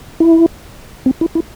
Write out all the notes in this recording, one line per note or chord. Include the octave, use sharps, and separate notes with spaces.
E4
C4
E4
E4